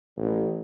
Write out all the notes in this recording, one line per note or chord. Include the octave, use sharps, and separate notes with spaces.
A1